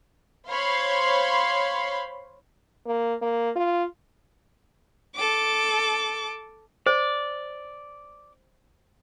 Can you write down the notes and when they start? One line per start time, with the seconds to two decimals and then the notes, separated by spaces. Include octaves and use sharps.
0.48 C5 C#5 F5 B5 C6
2.86 A#3
3.22 A#3
3.56 F4
5.16 A4 D6
6.86 C5 D5